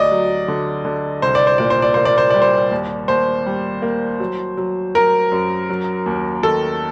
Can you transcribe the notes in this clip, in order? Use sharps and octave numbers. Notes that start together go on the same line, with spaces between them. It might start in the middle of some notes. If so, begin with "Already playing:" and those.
Already playing: D2 D5 D#5
F#3
D3
D3
C2 C5
D5
C5
A#2 D5
C5
D5
A#3 C5
D5
C5
G3 D5
C5
D#2
D#2 C5
G3
A#3
F#3
F#3
F#3 A#4
F#2
F#3
D#2
D#3 A4